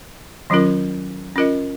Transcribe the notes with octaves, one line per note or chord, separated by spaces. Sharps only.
D#3 F#3 C#4 F4 A#4
C#4 F4 A#4 D#5